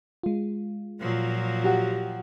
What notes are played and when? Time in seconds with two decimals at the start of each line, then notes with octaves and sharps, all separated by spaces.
0.23 G#3 F4
1.00 A#2 F3 F#3
1.64 F#4 G4 F#5